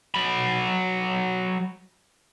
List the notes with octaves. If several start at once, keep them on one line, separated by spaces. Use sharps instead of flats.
F#3 B5